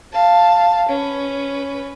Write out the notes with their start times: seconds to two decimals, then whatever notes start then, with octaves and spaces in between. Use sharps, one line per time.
0.12 F5 A5
0.88 C#4 B4